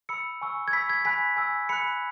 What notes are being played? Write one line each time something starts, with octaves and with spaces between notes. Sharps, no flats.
B5 E6 C#7
G#5 C#6 E6
G#6
B5 E6 B6
G#6
G#5 B5 F#6 B6
G#5 E6
B5 F#6 C#7